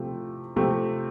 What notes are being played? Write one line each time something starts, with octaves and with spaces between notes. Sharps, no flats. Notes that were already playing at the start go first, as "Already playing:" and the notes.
Already playing: C3 F3 A3 C4 G4
C3 F3 A3 C4 G4